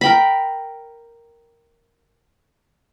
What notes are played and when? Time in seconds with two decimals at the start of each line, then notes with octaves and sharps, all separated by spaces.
0.01 A#4 G5 B5